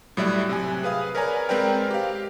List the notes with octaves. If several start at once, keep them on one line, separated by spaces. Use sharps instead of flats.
A2 F#3 G3 D5 E5 F#6
C3 G#5
G#4 B4 F5 D#6
A#4 B4 C#5 D5 G#5 A#5
G#3 C4 A#4 B4 D5 G5
G4 F5